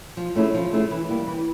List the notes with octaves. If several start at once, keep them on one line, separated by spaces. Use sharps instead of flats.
F3
A3 C#4 E4 G#4
F3
A3 C#4 E4 G#4
E3
G3 A#3
E3